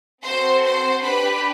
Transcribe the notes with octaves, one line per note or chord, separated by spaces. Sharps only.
C4 F#4 A4 C5 C6
C5 C6
D4 G4 B4 B5